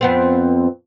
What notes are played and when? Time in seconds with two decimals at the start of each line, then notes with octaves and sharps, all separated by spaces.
0.01 F2 B3 C4